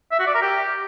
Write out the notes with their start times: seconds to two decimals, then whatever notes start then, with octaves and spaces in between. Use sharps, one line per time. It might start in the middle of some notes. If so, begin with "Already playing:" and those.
0.12 E5
0.19 F#4
0.27 D5
0.34 A#4
0.42 G4